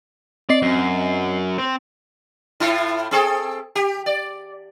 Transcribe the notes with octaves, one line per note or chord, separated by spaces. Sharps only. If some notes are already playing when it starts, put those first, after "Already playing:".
C4 D5 D#5 C7
F#2
C4
A2 E4 F4
C4 G#4 A4
G4
D5